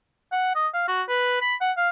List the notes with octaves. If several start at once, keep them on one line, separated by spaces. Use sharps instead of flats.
F#5
D#5
F5
F#4
B4
B5
F#5
F5